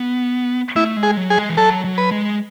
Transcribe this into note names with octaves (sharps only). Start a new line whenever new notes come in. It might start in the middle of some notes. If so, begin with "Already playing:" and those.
Already playing: B3
A3 E4
G#3
G#4
F#3
G#4
G#3
E3
F#3 A4
F#3
B4
G#3